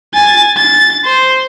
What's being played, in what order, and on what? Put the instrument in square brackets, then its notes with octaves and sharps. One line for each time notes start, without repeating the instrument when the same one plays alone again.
[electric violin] G#5 A6
A6
C5